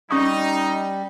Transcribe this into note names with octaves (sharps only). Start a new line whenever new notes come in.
G3 C#4 D#4 C#6 D#6